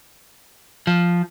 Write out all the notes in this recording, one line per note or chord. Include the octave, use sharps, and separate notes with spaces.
F3